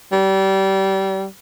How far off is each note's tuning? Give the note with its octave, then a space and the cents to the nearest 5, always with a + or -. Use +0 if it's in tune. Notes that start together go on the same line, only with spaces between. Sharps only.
G3 -25